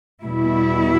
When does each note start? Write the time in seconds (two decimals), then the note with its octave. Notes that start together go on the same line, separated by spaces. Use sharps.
0.22 E2 B2 G3 E4